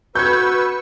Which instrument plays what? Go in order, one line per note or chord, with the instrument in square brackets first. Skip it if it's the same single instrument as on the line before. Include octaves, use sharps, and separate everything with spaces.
[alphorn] F#4 [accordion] B4 C#6 E6 [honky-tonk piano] G6 G#6